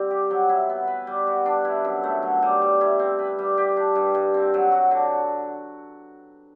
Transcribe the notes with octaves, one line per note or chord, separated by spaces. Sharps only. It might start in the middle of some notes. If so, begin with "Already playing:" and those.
Already playing: G3 C4
G4
F#3
E4
B3
B4
G3
F#4
D4
E4
F#2
A3
F#3
G3
G3
E4
C4
B4
G3
G4
D4
G2
G2
C4
F#3
F#4
D3